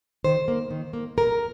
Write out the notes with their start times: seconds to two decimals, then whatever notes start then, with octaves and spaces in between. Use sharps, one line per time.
0.24 D#3 C5
0.48 A#3
0.71 D#3
0.93 A#3
1.17 A#2 A#4